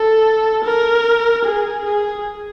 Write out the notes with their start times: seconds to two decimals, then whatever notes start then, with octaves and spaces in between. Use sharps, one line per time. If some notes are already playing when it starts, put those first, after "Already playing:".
Already playing: A4
0.64 A#4
1.45 G#4
1.85 G#4